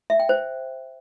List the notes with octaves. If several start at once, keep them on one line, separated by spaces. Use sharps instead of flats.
E5
G5
C5